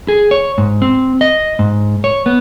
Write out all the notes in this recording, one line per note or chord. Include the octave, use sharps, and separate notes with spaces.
G#4
C#5
G#2
C4
D#5
G#2
C#5
B3